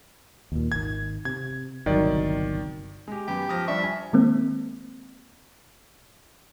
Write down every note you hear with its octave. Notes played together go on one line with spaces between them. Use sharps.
D#2 A#2
G#1 D#3 G#6
C3 G#6
G1 C2 D#3 F#3 D5
G#3 G4
F#2 B3 G4
F3 D#6 F6 A#6
G3 D4 E5 C#6
G#5
D#3 G#3 A#3 C4